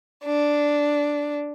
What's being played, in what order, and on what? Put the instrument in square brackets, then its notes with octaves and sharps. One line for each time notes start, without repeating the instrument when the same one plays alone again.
[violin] D4